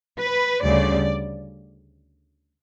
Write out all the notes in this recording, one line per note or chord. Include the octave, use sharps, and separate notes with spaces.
B4
D2 C#3 G3 D5